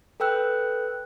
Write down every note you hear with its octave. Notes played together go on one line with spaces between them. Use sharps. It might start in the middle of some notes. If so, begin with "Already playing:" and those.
A4 B4 G5 E6 F#6